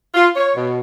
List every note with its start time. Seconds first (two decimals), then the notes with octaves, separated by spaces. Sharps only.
0.15 F4
0.36 C#5
0.56 B2